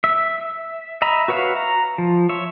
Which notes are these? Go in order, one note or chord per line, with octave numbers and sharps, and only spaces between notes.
E5
D#5 E5 A#5 B5
F#4 B4 C#5 E5 F5
A#5
F3
C#5 E5